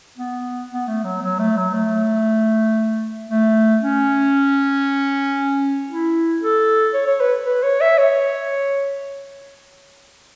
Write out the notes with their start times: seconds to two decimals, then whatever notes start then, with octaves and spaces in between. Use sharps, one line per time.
0.17 B3
0.70 B3
0.87 A3
1.04 F#3
1.22 F#3
1.39 A3
1.57 F#3
1.74 A3
3.29 A3
3.82 C#4
5.90 E4
6.42 A4
6.94 C#5
7.07 C#5
7.20 B4
7.46 B4
7.63 C#5
7.81 E5
7.98 C#5